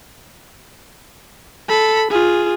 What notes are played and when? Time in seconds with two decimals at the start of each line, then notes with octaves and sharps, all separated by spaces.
1.69 A4 B5
2.10 F4 G#4